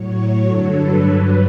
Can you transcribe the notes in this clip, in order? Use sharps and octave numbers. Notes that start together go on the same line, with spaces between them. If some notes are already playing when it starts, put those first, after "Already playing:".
Already playing: A2 F#3 C#5
G2 D3 F#3 A4
B4
G2 F#3 B4